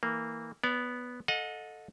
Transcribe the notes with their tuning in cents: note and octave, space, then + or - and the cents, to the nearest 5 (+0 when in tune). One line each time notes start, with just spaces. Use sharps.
E3 -20 A#3 -15
B3 -5 D5 -35
A4 +0 D#5 +0 F#5 -40